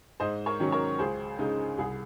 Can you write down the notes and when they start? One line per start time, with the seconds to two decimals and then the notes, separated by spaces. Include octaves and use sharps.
0.20 G#2 C5 D#5
0.46 A#4 C#5
0.60 D#3 F#3 C#4
0.72 A#4 C#5
0.99 C#2 G#4 C5
1.39 C#3 G#3 D#4
1.78 C2 G#4